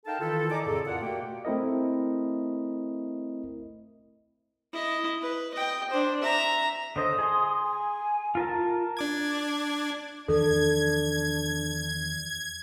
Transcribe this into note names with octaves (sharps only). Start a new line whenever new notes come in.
D#4 A4 A#4 F5 G5 A5
D#3 E3 E4 F4 A4
D5 D#5 G#5 A#5 D6
F2 A2 C#3 E4 G#4 A4
F4 A#4 D5 F#5
B2 A3 A#3 F#4 G4 G5
A3 C4 E4 A#4 D#5
E4 D#5
B4
D#5 G5
D4 C5
E5 A#5
D3 C5 D#5 D#6
G#4 C6
G#5
F4 A#4 A5
D4 D6 G#6
E2 D#3 F3 D4 A4 G#6